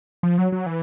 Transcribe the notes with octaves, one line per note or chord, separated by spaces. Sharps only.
F3
F#3
F#3
E3